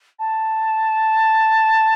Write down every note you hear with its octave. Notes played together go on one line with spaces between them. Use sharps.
A5